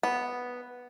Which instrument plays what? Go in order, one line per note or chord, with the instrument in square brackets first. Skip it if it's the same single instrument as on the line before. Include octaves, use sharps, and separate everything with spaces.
[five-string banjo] B3